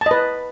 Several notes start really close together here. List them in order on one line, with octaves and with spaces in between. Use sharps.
A5 D#5 B4